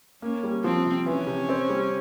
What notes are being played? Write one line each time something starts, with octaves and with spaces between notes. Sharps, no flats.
A#3 C#4
G3
F3 C4
C3
E3 C#4
C3
C4
G3